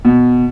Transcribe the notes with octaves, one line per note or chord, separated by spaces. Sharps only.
B2